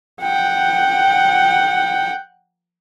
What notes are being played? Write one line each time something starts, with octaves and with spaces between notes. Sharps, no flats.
F#5 G5